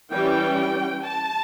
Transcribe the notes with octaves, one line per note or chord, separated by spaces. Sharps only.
E3 G3 C#4 G5
A5